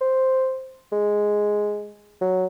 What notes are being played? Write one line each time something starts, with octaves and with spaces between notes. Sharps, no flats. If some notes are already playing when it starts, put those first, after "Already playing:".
C5
G#3
F#3